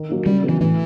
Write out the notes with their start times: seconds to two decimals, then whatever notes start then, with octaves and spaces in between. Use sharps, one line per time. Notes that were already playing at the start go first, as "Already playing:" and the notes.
Already playing: D#3
0.09 F#3 A#3 D#4
0.26 C#3 G3
0.43 F#3 B3
0.49 E3
0.60 A2 E3